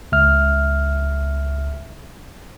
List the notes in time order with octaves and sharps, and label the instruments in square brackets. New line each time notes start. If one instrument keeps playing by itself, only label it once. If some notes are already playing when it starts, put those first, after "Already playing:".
[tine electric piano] C#2 E5 F6